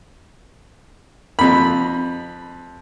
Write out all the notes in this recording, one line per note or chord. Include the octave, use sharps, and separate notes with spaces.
F2 B5